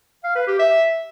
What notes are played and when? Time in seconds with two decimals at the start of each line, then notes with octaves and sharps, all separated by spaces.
0.24 F5
0.36 B4
0.47 G4
0.59 E5